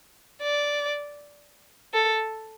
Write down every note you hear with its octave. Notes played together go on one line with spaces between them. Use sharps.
D5
A4